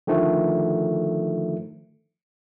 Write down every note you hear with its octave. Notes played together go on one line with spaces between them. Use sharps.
D3 D#3 F3 A3